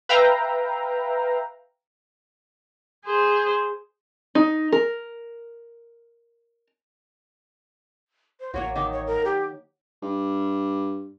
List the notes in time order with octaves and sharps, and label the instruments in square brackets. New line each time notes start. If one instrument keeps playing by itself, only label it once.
[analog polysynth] B4 E5 F5 G5 A#5
[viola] G#4 C5
[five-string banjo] D#4
A#4
[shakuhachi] C5
[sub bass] A1 [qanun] F#3 A#3 F#4 [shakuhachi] C#5
[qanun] D#3 D#4 [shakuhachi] D6
[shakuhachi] C#5
A#4
G4
[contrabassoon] G2